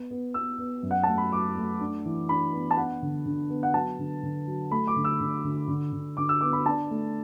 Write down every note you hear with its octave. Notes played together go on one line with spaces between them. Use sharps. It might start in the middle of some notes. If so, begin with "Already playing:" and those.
Already playing: B3
B3
B3 E6
B3
F#2
F#5
A3 A5
B5
F#3 D6
A3
D4
E3
D4 B5
B3
A5
B3 F#5
D3
D3
B3
F#5
F#3 A5
D3
D3
F#3
A3 B5
D6
D3
E6
D3
D3
D3
D3
D3 D6
E6
B3 D6
B5
D4 A5
A3